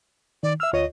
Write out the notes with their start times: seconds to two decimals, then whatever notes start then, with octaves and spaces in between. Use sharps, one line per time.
0.43 D#3 D5
0.60 E5 E6 F6
0.73 D2 F4 C#5 D#5